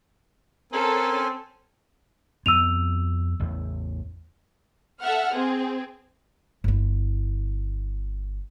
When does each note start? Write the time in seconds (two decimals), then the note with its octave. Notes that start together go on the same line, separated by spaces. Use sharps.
0.72 C4 C#4 A4 A#4 G#5 C6
2.46 F2 B3 E6 D#7 F7
3.40 A1 E2
5.01 A4 E5 F#5 F6
5.33 C4 G#4
6.64 G1 E4